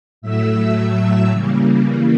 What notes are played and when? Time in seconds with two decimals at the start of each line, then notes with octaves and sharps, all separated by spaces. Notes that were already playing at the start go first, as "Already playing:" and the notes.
0.22 A2 F#3 A3 E5 E6
0.75 E5 E6
1.29 C#3 E3 G3 A#3